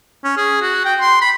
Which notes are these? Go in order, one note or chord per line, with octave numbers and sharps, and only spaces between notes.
C#4
G#4
F#4
G5
C6
B5